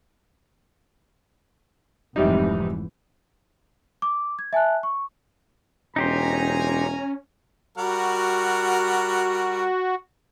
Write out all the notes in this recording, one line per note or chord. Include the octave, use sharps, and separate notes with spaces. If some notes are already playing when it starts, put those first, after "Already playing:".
F1 G#2 C3 E3 G3 D#4
D6
G#6
E5 G#5 A5 F#6
C#6
E1 C#4 D#4 G4 C5 G#5 A#5
G3 F#4 A#4 F#5